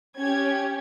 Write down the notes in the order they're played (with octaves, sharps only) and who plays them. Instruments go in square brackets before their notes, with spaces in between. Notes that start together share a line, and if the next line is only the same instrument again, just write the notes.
[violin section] C#4 G4 G#6